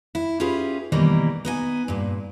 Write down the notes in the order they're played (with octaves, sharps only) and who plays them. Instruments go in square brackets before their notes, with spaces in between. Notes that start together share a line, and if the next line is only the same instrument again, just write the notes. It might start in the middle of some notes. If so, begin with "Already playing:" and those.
[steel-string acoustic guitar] E4
C#4 F4 G4 G#4 B4
B2 D#3 E3 G3 A#3
B3 D#4 G#5
G2 A#2